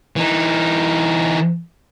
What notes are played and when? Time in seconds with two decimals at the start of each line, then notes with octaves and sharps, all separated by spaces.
0.16 E3 D#4